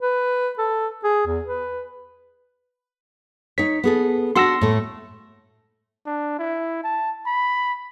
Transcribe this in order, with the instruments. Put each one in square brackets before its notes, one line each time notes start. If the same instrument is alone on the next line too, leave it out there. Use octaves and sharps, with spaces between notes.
[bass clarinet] B4
A4
G#4
E2
B4
[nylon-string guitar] D#4 C#5 [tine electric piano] B6
[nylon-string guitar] B3 G#4 A4
[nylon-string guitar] D4 F#4 F#5 [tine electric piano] C6 E6 A#6
[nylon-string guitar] A2 A3
[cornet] D4
E4
A5
B5